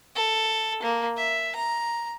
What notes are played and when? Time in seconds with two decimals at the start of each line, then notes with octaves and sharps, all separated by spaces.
0.16 A4
0.83 A#3
1.17 E5
1.55 A#5